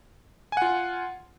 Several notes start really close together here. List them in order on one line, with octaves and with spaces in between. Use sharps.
G#5 F#5 F4